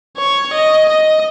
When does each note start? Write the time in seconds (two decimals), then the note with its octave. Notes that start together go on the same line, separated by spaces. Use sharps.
0.18 C#5
0.53 D#5
0.89 D#5